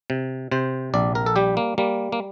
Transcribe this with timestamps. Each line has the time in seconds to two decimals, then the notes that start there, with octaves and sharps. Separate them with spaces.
0.10 C3
0.51 C3 C5
0.94 A#1 D5
1.15 A#4
1.26 A4
1.36 G3 G4
1.57 A#3
1.78 G3 A#3
2.12 A#3